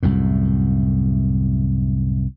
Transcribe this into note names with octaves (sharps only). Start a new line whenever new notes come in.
C2 F#2 A2